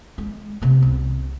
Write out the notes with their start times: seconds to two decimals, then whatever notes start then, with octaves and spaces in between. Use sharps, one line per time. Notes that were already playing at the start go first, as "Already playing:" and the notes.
0.18 G#3
0.62 C3 B3
0.82 C2